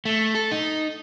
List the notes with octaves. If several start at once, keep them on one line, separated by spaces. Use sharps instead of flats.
A3
A4
D#4